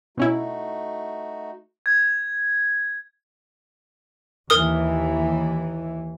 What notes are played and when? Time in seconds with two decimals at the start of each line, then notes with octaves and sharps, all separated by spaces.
0.17 B2 A3 C#4 D#4 E4 F#4
1.86 G#6
4.50 D#2 E3 A#4 D#6